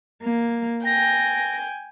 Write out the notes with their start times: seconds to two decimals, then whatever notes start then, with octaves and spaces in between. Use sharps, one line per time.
0.20 A#3
0.85 G5 G#5 A#6